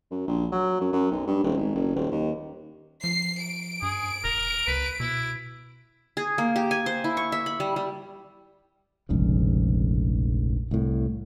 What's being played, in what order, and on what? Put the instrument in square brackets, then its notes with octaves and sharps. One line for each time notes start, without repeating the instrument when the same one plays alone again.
[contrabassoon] F#2
A#1
F#3
F#2
F#2
B1
G2
D#1
G#1
F#1
D#1
D#2
[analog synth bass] F3 [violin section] C7
[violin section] D7
[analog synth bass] G2 [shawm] G#4
[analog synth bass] E1 [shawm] A#4
[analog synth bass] C#2 [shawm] B4
[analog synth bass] B2 [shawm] E4
[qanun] G#4
A#3
G4
G#5
C5
E4
C#6
E5
B5
G3
G3
[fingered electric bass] F1 A#1 G#2 C#3
C2 A2